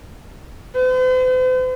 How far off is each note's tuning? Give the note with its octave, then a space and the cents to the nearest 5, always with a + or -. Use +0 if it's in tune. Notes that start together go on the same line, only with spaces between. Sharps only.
C5 -45